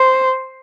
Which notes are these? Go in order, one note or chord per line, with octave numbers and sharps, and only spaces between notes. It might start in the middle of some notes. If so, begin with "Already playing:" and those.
Already playing: C5